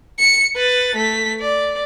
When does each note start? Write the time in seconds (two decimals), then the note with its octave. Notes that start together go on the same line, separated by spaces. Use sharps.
0.19 C#7
0.56 B4 A6
0.96 A3 B6
1.41 D5